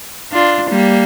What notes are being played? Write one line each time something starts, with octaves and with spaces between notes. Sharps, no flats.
D4 F4
G3 A#3